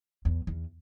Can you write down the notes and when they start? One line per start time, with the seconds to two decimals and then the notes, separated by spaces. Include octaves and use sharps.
0.25 E2
0.47 E2